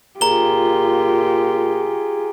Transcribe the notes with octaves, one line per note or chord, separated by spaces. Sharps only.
A#2 F4 G4 G#4 A#5 G7